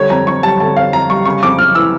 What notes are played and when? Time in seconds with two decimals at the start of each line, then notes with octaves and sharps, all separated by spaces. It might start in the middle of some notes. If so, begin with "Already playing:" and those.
Already playing: D3 G3 C#5
0.10 F2 A#5
0.27 F2 C#6
0.43 G3 A5
0.60 D3 A5
0.76 F2 F5
0.93 F2 A#5
1.10 G3 C#6
1.25 C#3 C#6
1.43 F2 D6
1.59 F2 F6
1.75 E3 E6